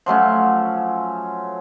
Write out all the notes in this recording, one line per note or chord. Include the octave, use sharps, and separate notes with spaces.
F3 F#3 A3 C#4